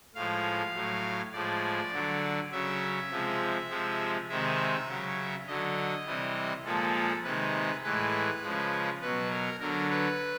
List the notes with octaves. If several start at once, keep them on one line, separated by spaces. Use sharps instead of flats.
A2 F3 G#3 F5
A2 F#3
A2 F3 G#3 D5
D3 F#3
C#3 F#3 E5
C3 F3 G#3
C3 F3 G#3
C3 D#3 G#3 E5
C#3 F#3
D3 F#3 D#5
C3 E3 G3
A#2 F3 G#3 A4
C3 D#3 G#3 B4
A2 E3 G#3 B4
C#3 F3 G#3
B2 F#3 B4
A#4
D3 F#3 A#4
B4